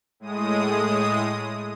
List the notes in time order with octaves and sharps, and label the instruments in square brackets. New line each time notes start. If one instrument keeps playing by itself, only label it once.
[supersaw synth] A2 G#3 D#6